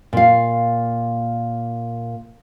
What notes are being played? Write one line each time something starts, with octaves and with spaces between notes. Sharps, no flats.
A#2 F5